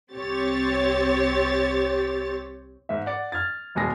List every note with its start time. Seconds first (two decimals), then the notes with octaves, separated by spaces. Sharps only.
0.14 C2 C4 G4 C#5 A6
2.89 G#2 E5
3.06 D5 F#5
3.32 F6 G#6 A6
3.75 G1 E2 B2 G#3 G#4 A#6